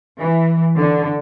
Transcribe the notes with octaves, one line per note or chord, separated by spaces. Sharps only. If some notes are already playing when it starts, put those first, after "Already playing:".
E3
D3